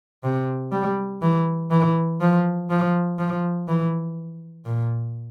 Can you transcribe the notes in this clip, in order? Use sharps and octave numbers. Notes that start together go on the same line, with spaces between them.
C3
G3
E3
E3
F3
F3
F3
E3
A#2